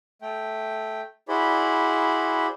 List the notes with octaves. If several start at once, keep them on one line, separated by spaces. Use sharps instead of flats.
A3 G5
E4 F#4 G#4 C5 D5 B5